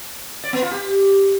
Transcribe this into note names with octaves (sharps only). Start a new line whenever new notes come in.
D5
B3
F4
G4